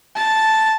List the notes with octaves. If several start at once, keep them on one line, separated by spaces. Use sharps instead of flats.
A5